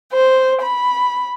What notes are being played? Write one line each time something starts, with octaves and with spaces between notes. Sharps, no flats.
C5
B5